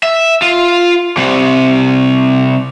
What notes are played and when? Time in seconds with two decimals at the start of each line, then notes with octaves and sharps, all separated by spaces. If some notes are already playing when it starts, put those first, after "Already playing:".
0.03 E5
0.42 F4
1.17 C3 G3